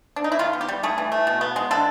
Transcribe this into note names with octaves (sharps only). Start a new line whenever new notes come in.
D4
D#4
E4
D#3 F4
B3
G4
G3
A3 G#4
E3
A3
B2
B3
G#3
D3 A4